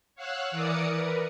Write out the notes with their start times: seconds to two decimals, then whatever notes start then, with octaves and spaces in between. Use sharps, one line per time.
0.15 C#5 F5 F#5 E6 F#6
0.51 E3 A#4 D5 D6 D#6 C#7
0.89 A#4 B4